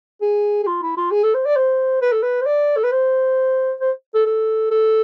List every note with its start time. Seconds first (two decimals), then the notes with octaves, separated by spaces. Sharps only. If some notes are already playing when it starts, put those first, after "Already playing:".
0.22 G#4
0.63 G#4
0.67 F4
0.82 E4
0.97 F4
1.11 G#4
1.23 A4
1.34 C5
1.45 D5
1.56 C5
2.02 B4
2.12 A4
2.23 B4
2.41 C5
2.46 D5
2.76 A4
2.84 B4
2.91 C5
3.81 C5
4.15 A4
4.26 A4
4.71 A4